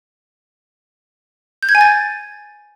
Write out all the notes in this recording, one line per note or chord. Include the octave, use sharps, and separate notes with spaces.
G6
G#6
G#5
A6